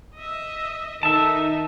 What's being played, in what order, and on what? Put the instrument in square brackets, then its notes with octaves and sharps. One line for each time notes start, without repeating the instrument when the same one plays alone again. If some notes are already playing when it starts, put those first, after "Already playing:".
[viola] D#5 E5
[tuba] D#3 [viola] D#4 A4 [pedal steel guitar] E5 A5